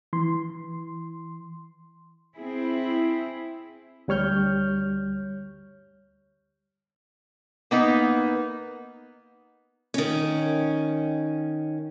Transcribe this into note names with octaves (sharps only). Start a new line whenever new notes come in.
E3 C6
C4 E4 G#4
D2 G3 C#5 F6 G6
A#3 B3 D#4
D#3 C#4